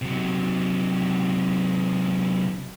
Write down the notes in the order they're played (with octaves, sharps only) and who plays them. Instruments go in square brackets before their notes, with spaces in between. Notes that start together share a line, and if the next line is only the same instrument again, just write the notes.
[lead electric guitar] C3 F#3